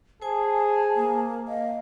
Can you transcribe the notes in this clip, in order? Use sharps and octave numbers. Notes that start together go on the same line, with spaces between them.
G#4 C5 G#5 A5
A#3
D#5 F5